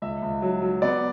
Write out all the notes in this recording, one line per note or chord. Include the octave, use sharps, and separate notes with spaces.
C#2 E5
C#2
F#3
F#3
B3 D5